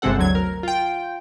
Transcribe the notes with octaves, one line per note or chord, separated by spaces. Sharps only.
G1 C3 G#3 C4 A4 F#5
D2 F#3 G#6
A#4
F4 G5